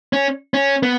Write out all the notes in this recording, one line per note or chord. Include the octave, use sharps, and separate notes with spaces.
C#4
C#4
B3